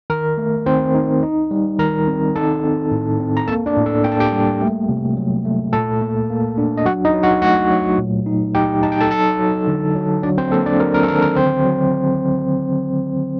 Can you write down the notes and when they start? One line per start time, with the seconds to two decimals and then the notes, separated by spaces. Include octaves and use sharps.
0.10 D#3 A#4
0.38 A3
0.66 D#3 C4 C5
0.95 D#4
1.23 D#4
1.51 G3
1.79 D#3 A#4 A#5
2.07 C4
2.36 D#4 A4 A5
2.64 C4
2.91 A2
3.20 C4
3.37 A#5
3.48 A#3 A4 A5
3.66 D4 D5
3.77 A2
3.86 A4
4.04 A#3 G5
4.12 A5
4.20 G4 G5
4.32 G3
4.61 A3
4.89 C3
5.17 F#3
5.45 A3
5.73 A#2 A4 A5
6.02 A#3
6.30 A#3
6.58 D4
6.77 D#5
6.86 F#3 F#4 F#5
7.05 D#4 D#5
7.14 F#3
7.23 F#4 F#5
7.42 A3 F#4 F#5
7.70 F#3
7.98 A#2
8.26 D#4
8.55 D#4 G4 G5
8.83 D#4 A5
8.92 G5
9.01 A4 A5
9.11 F#3 A4 A5
9.39 F#3
9.67 D3
9.96 F#3
10.23 F#3 D4 D5
10.38 C4 C5
10.52 A#3 A4
10.66 D4 D5
10.80 F#3 A#4
10.94 A#4
11.03 A4
11.08 D#3 A#4
11.22 A#4
11.36 D3 C4 C5
11.64 F#3